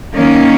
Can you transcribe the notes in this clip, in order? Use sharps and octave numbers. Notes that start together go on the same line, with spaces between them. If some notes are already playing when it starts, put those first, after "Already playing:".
D#3 A#3 C#4